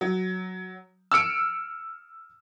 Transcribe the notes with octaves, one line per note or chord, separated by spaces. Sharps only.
F#3
E6 F6 C#7 D7